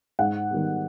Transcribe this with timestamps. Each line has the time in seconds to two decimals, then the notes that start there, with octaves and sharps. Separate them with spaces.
0.19 G#2 F#5
0.51 D#3 G3 B3